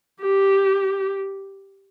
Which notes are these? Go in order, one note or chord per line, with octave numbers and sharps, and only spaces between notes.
G4